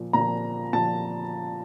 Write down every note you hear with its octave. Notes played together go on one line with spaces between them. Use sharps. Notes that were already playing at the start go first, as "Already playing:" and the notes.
Already playing: A#2 F3
A#2 F3 A#5
A#2 F3 A5